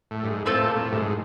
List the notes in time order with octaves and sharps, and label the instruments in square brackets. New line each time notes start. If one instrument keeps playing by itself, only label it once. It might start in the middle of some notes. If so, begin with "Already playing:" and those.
[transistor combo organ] A2
G2
G#2
[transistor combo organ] A2 [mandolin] A3 C4 F4 A4
[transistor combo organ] A#2
A#2
A2
G2
G#2